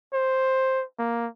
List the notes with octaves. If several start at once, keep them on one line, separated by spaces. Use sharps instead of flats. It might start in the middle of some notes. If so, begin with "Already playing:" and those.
C5
A#3